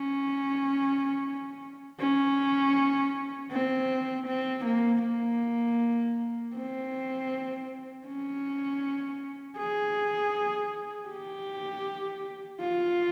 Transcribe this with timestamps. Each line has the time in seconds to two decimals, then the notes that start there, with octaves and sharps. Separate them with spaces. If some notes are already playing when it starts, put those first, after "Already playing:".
Already playing: C#4
2.00 C#4
3.51 C4
4.27 C4
4.65 A#3
5.03 A#3
6.55 C4
8.06 C#4
9.58 G#4
11.09 G4
12.60 F4